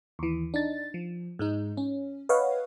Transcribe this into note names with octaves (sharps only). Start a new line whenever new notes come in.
D#2 E3
D4 D#4 A6
F3
G#2 G#3 D#4
C#4
B4 C#5 D#5 F5 F#5